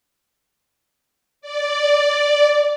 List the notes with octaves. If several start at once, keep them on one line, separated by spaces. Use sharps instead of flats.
D5